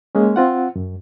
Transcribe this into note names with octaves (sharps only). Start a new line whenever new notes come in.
G#3 A#3 C#4
C4 F4 F#5
F#2